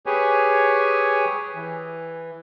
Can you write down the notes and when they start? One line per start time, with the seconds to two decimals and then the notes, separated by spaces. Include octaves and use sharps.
0.06 G4 G#4 B4 C#5 G#5
1.55 E3